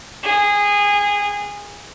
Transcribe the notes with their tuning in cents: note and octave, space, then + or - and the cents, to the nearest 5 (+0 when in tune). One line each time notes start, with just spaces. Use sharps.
G#4 -20 G5 +0